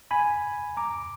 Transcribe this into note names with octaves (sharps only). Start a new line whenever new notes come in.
G#5 B5
A#5 D6